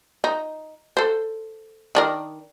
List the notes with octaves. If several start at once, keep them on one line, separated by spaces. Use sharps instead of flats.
D#4
A4 C5
D#3 D4 A#4